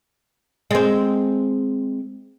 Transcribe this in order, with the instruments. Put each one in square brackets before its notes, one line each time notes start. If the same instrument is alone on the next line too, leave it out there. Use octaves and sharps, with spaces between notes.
[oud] G#3 C4